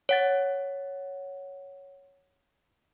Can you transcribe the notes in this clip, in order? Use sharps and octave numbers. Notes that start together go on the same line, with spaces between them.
C#5 F#5 A6